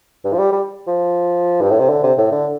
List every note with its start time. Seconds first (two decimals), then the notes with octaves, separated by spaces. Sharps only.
0.24 G2
0.33 F3
0.39 G3
0.52 G3
0.87 F3
1.61 G2
1.70 A2
1.79 C3
1.89 D3
2.03 C3
2.18 A2
2.32 D3